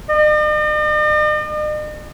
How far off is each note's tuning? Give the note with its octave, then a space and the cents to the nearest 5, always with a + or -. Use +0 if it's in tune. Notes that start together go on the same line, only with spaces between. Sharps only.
D#5 -45